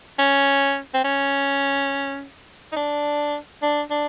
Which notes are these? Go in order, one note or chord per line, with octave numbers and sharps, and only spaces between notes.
C#4
C4
C#4
D#4
D4
D4
D4